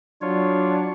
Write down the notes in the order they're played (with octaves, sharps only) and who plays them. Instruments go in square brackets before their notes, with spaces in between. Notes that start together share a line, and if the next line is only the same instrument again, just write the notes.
[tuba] F#3 [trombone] D4 [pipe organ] F4 C#5